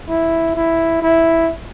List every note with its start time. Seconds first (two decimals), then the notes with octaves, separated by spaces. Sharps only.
0.09 E4
0.56 E4
1.02 E4